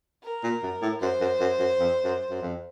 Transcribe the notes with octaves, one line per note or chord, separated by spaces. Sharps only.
A#4
A#2
F#2
A2
F#2 C5
F#2
F#2
F#2
F2
F#2
F#2
F2